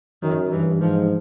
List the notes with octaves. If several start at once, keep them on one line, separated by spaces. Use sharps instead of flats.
F#2 D#3
G2 E3
G#2 F3